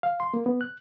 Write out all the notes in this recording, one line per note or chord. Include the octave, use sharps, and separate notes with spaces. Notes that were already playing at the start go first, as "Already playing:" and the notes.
F5
C6
A#3
B3
F#6